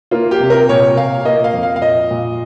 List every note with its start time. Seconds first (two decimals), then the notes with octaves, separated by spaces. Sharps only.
0.11 A#3 F4
0.31 G4
0.40 C3
0.50 A#4
0.68 A#2 C#5
0.97 A#2 F5
1.25 A#3 D#5
1.44 F5
1.54 F2
1.63 F5
1.76 F5
1.81 A#2 D#5
2.11 A#2